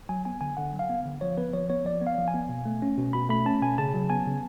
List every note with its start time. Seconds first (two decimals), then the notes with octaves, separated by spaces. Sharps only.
0.09 F#3 G#5
0.25 B3 G#5
0.41 D3 G#5
0.57 D3 F#5
0.73 F#3
0.79 F5
0.89 B3
1.06 D3
1.21 F3 C#5
1.37 B3 B4
1.53 F3 C#5
1.70 B3 C#5
1.85 F3 D5
2.02 B3
2.07 F5
2.18 F3
2.28 G#5
2.34 B3
2.49 B2
2.65 A3
2.82 C#4
2.98 B2
3.13 B2 B5
3.29 A3 B5
3.46 C#4 A5
3.62 B2 G#5
3.78 C#3 A5
3.94 F#3
4.10 B3 G#5
4.27 C#3